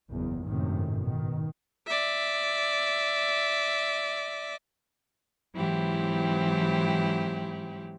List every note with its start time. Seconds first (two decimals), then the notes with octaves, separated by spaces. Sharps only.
0.11 F#1 E2
0.45 G#1 F#2 A2 C3 D#3
1.00 B2 D#3
1.87 D5 E5
5.54 G#2 E3 F#3 C4 E4 G4